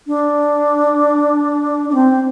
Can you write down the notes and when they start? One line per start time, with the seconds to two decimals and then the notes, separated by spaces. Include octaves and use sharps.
0.07 D4
1.89 D4
1.94 C4